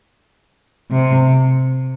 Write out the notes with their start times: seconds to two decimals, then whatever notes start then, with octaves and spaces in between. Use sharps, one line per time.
0.91 C3